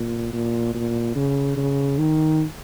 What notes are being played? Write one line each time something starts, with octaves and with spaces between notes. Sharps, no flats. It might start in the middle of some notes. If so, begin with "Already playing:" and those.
Already playing: A#2
A#2
A#2
C#3
C#3
D#3